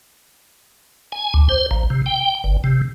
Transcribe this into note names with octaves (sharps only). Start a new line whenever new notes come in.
G#5
D2
C5
A#1
C3
G5
G1
C3